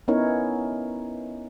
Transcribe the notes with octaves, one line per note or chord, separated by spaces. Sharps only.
B3 C#4 D#4 E4 A#4 C#5